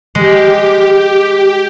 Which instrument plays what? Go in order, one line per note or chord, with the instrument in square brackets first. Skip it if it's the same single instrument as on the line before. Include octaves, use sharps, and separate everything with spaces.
[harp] G#3 [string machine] G4